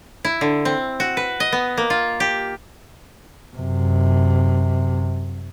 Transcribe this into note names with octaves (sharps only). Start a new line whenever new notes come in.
E4
D3
C4
F#4
B4
D#5
B3
A#3
F4
G4
F#2 C3